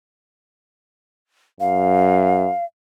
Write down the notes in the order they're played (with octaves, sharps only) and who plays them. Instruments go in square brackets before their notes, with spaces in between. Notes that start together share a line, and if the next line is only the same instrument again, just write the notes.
[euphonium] F#2 [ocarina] F5